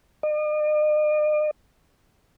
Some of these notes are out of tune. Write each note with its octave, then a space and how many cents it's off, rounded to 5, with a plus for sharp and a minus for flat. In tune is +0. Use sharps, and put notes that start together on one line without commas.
D#5 -45